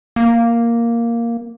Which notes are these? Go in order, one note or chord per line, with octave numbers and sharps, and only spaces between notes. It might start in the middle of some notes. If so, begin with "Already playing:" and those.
A#3